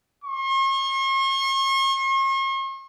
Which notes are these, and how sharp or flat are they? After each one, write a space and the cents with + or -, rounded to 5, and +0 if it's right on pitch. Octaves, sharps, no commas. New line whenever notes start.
C#6 -45